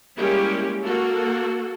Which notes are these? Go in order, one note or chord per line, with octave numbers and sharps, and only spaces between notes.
G3 G#3 A#3 C#4 E4 G4
A#3 F#4 A4